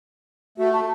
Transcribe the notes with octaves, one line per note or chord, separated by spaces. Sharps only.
A3 F#4
A5